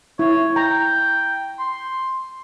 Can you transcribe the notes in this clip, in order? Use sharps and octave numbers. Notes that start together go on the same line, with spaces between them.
E4 C#5
G5 A#5
C6